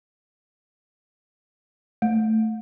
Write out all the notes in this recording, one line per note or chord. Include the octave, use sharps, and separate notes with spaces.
A3